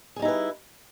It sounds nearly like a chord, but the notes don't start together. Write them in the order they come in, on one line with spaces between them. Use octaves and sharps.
G#4 G3 D#4 E4 B4